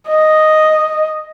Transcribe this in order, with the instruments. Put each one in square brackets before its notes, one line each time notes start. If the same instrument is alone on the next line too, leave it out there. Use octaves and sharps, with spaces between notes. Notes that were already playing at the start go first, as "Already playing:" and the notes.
[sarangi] D#5